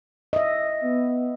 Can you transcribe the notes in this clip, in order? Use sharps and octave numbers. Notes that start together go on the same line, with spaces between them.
D#5 E5
B3